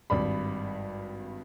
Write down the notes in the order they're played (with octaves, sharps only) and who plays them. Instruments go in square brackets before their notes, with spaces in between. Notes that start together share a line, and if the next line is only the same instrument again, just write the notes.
[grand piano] G#1 G2 D5 B5